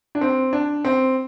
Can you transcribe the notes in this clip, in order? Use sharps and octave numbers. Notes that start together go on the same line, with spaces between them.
D4
C4
D4
C4